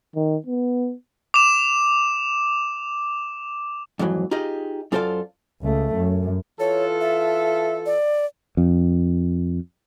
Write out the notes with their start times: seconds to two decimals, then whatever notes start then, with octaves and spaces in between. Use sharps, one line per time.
0.16 D#3
0.47 B3
1.34 D6 E7
3.99 F2 G#2 E3 F#3
4.31 D#4 F4 G4 G#4 D#5
4.92 F#2 F4 A4 C5 D5 F5
5.62 C#2 A3
5.95 F#2
6.60 E3 F4 A4 C#5
7.01 E5
7.86 D5
8.57 F2